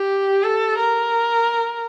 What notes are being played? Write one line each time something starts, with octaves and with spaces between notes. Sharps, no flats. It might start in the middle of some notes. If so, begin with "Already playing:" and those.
Already playing: G4
A4
A#4